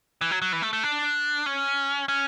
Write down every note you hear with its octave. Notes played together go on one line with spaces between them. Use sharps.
E3
F#3
F#3
E3
A3
A3
D4
C#4
C#4